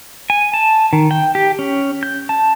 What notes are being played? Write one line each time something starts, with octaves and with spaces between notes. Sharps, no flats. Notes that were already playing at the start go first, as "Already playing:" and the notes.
G#5
A5
D#3
G5
G4
C#4
G6
A5